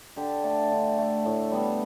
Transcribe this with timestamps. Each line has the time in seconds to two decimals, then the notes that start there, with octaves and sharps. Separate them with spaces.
0.16 D3 G4
0.44 A3 D5
0.72 D3
0.98 A3
1.25 A2
1.52 G3 B3